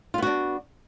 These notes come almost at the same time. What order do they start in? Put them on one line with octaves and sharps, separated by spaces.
F4 B3 F#4 D4